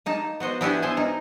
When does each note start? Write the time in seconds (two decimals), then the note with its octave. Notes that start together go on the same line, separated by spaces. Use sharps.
0.06 A#3 D#4 A5
0.40 B3 F#4 C5 D#5
0.61 B3 D4 E4 F#4 G4 G#5
0.82 B3 G#4 C5 G#5 A5
0.97 D#4 A#4